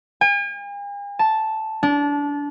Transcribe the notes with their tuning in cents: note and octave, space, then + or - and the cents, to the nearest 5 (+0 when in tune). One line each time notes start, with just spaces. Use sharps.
G#5 -45
A5 -5
D4 -25